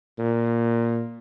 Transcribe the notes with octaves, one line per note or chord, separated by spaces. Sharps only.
A#2